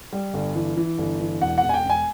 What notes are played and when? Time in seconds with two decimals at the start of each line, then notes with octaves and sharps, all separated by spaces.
0.13 G3
0.34 G1
0.55 E3
0.77 E3
0.98 G1
1.20 E3
1.42 E1 F#5
1.58 F#5
1.63 E1
1.69 G#5
1.74 G5
1.85 E1 G#5